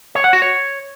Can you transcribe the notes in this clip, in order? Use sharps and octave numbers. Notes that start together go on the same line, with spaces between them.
C#5
F#5
F#4
C#5